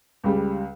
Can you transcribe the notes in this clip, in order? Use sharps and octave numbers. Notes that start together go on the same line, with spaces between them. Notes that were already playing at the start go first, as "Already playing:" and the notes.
C#2 C#3 G3